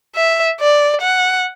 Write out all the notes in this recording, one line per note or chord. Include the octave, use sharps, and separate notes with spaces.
E5
D5
F#5